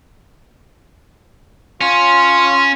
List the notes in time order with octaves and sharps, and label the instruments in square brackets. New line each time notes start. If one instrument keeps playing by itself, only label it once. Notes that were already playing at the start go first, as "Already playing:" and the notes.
[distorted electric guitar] C#4 [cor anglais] F4